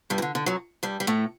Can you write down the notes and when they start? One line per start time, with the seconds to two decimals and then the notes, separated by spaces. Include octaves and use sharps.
0.10 G2 G3
0.18 E3
0.22 D3
0.35 D3
0.46 F#2 F#3
0.83 G2 G3
1.00 G3
1.07 A2 A3